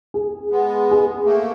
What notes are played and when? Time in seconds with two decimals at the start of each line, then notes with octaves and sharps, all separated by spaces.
0.14 G#4
0.51 G#3 B3
0.91 G#4
1.25 A3 A#3